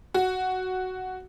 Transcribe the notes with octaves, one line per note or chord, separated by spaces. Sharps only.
F#4